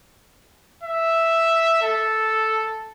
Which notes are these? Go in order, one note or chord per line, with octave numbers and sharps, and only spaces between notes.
E5
A4